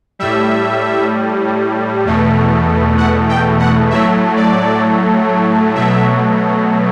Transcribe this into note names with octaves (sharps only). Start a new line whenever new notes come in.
A2 G3 E5
E2 B2 A3
F#5
G5
F#5
A2 F#3 A3 E5
D5
B2 F#3 A3 E5